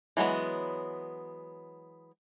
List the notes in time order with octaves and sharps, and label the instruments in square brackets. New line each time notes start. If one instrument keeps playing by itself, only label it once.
[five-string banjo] E3 F#3 G#3 B3